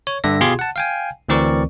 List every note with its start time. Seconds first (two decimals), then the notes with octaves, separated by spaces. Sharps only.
0.07 C#5
0.24 G2 D3 E5 A#6
0.41 B2 F4 G4 G#4 C6 G#6
0.59 F#5 A5
0.76 F5 G5 G#5
1.29 D2 E3 C4 A#4 D5 C#6